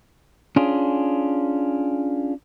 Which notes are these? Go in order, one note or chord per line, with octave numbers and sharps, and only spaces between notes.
C#4 D4 F4 G#4